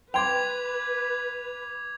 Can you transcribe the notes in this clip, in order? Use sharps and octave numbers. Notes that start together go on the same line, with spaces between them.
B4 G5 C6 D6 G#6 F7